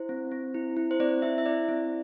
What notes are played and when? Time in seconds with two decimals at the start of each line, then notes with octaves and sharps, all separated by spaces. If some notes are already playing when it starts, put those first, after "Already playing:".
Already playing: E4 C5
0.09 C4
0.31 C4
0.54 E4
0.77 E4
0.91 C5
1.00 C4 D5
1.22 E4 E5
1.38 E5
1.46 E4 D5
1.69 C4